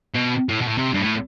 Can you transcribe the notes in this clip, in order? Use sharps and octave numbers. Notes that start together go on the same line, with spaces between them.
B2
A2
B2
A2
C3
G2
A2